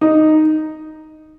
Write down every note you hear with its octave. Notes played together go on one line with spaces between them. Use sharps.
D#4